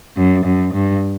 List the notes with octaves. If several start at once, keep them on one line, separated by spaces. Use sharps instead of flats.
F#2
F#2
G2